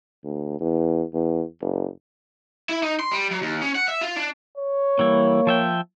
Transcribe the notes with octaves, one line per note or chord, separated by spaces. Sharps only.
D2
E2
E2
F#1
E4
D#4
C6
G3
F#3
D#2
C#4
F#5
E5
F4
D4
C#5
E3 G3 A#3 E4
F3 E5 G5